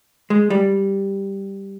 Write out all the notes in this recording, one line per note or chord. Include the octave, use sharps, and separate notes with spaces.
G#3
G3